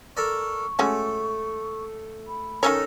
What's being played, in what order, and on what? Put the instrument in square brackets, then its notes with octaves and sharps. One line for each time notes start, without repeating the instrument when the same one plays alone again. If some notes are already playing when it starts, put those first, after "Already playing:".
[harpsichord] A4 A#4 D5 [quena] C#6
[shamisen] G#3 C#4 F#4 [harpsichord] A3
[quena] B5
[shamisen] D#3 C#4 C#5 [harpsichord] D#4 A4 A#4